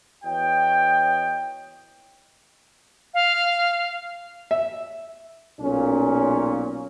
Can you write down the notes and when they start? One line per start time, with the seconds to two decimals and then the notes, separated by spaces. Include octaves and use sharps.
0.24 E2 F#4 C#5 D#5 G5
3.14 F5
4.51 E5
5.61 B1 A#2 C#4